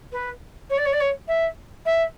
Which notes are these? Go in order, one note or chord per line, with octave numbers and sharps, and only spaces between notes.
B4
C#5
D5
C#5
D5
C#5
E5
E5